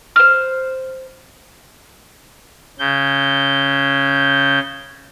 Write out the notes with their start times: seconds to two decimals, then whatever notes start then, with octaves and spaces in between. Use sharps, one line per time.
0.16 C5 F6
2.79 C#3 G6